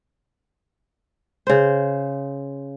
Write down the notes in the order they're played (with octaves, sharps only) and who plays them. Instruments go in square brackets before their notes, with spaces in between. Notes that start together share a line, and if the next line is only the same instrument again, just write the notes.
[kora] C#3 C5